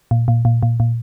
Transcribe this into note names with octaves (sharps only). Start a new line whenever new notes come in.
A#2
A#2
A#2
A#2
A#2